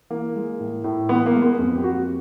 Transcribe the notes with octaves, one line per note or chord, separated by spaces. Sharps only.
E3 A#3
G#3
A2
A2
E3 B3
A#3
G#3
B3
F2
G4
A#3 F#4